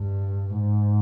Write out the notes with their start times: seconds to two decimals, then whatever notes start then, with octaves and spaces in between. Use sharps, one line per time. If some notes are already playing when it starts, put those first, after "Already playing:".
Already playing: G2
0.57 G#2